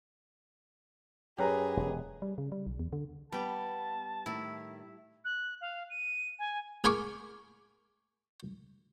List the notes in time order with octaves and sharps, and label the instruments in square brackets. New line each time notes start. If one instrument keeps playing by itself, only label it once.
[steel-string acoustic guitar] F#2 [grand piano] G4 B4 A#5 [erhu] G#4
[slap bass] E1
[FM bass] G3
C#3
G3
B1
E2
D3
[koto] G3 G4 [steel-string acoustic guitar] B3 [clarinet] A5
[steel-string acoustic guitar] A2 D#3 [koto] E4
[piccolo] F#6
F5
D#7
G#5
[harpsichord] G#4 A#4 G#5 B5 C#6 D6